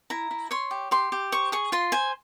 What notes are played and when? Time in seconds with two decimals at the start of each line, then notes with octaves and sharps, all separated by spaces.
0.10 E4 A#5
0.31 E4
0.51 C#5 C6
0.71 G4
0.91 G4 C6
1.12 G4
1.32 C5 C#6
1.52 G#4 C#6
1.72 F4 C6
1.92 C5 G#5